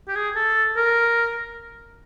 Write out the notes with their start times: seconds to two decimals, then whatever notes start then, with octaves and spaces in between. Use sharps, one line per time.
0.08 G4
0.15 G#4
0.36 A4
0.77 A#4